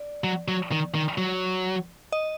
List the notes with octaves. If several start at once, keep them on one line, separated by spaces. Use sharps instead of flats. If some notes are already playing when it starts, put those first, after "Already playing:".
Already playing: D5
F#3
F#3
D#3
D#3
F#3
D#5